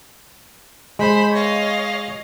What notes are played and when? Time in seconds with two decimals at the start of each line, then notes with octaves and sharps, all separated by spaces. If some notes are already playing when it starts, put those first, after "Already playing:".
0.99 G#3 C5 B5
1.32 C#5 D#5 F5